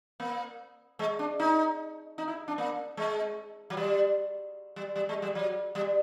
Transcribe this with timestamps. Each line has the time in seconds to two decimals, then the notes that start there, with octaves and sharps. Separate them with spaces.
0.20 A#3
0.99 G#3
1.19 D4
1.40 D#4
2.18 D#4
2.28 E4
2.48 D4
2.58 A#3
2.97 G#3
3.70 F#3
3.77 G3
4.76 G3
4.96 G3
5.09 G#3
5.22 G3
5.35 F#3
5.75 G3